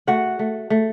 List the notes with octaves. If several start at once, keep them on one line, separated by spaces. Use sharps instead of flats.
A3 F#4 F#5
A3
A3